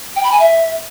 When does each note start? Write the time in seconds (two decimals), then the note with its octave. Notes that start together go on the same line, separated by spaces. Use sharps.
0.16 G5
0.24 B5
0.32 G#5
0.40 E5